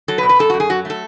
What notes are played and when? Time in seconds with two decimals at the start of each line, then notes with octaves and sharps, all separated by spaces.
0.08 F#3 A4
0.18 B4
0.23 B2
0.29 B4
0.39 F#2 A4
0.50 F#2 F#4
0.60 G#4
0.70 F#3 F#4
0.85 A3 A4